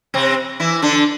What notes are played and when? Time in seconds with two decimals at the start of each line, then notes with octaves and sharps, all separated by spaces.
0.14 C3 C4
0.60 E3 E4
0.82 D3 D4